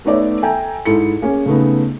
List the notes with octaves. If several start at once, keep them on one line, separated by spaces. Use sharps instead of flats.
A3 B3 D#4 C#5 D5 E5
A4 E5 G5 G#5 A#5
G#2 E4 A4 C#7
A#3 C#4 G#4
C#3 A3 B3 D#4